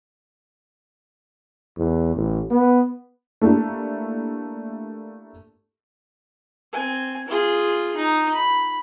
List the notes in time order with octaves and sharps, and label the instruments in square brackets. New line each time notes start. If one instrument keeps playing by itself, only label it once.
[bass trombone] E2
A1
B3
[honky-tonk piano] A3 A#3 D4 E4 G4
[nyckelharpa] C4 G#5
F4 G#4
D#4
B5